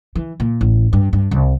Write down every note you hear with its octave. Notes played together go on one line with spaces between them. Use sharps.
E3
A#2
A1
G2
G2
C2